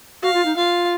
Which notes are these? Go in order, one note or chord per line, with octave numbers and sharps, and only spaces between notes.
F#4 F5
F4
D#4
F4 F5